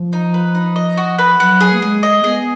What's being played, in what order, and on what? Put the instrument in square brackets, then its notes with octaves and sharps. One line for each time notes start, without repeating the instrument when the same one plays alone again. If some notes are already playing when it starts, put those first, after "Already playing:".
Already playing: [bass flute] F3
[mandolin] D#4
B4
D#4
D#5
F#4
B4
[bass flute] F#3 [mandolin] F#5
[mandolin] G#4
[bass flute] A#3
[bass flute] G#3 [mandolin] G#4
[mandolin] D#5
[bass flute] B3 [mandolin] G#4